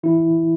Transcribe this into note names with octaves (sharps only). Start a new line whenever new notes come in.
E3 E4